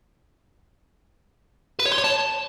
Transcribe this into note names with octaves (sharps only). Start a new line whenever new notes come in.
B4
C#5
C6
C#5
A5